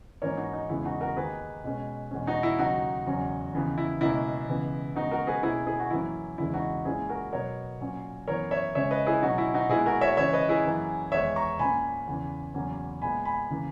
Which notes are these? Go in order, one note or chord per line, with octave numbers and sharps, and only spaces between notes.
G#2 E3 A#3 C#4 A#4 C#5
D#4 F#4
D#4
E2 C#3 G#3 B3 E4
D#4 F#4
F#4 A#4
D#2 D#3 A#3 G#4 B4
B2 G#3 C#4
E2 B2 G#3 C#4
D#4 F#4
E4
D#2 C#3 F#3 D#4 F#4
E2 C#3 F#3 C#4
D#2 C#3 E3 B3
E4
C#2 B2 A#3 C#4 E4
C#2 C#3 E3 B3
D#2 C#3 G#3 B3 D#4 F#4
F#4 A#4
G#4 B4
B2 A#3 C#4 E4 G#4
E4 G#4
F#4
F#2 E3 A#3 C#4 E4
E2 C#3 E3 G#3 E4
D#4 F#4
A#2 G#3 C#4 E4 G#4
F#4 A#4
B2 F#3 B3 A#4 C#5
A#2 F#3 C#4
F#2 E3 B3 A#4 C#5
C#5 E5
C#2 C#3 G#3 C#4 C#5 E5
B4 D#5
E4 G#4
B2 F#3 C#4 D#4 F#4
E4
D#4 F#4
A#2 G#3 B3 E4 G#4
F#4 A#4
C#5 E5
C#2 C#3 E3 C#5 E5
B4 D#5
E4 G#4
F#2 E3 A#3 C#4
E2 D#3 G#3 B3 C#5 E5
A#5 C#6
A#2 A#3 C#4 G#5 B5
E2 C#3 E3
E2 C#3 F#3 A#3 C#4
A#2 G#3 B3 G#5 B5
G#5 B5
C#3 E3 A#3